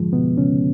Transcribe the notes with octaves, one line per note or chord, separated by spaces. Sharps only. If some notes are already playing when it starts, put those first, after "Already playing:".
Already playing: F2 G#2 D3 F3 G#3
B2 B3
C#3 C#4